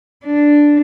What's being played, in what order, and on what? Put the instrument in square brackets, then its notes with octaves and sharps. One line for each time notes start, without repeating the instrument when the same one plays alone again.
[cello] D4